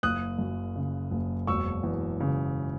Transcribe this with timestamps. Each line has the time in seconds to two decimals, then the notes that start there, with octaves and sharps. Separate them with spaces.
0.03 F#1 D#6 F#6
0.39 F#2
0.76 C#3
1.11 F#1
1.47 E1 C#6 E6
1.83 E2
2.20 C#3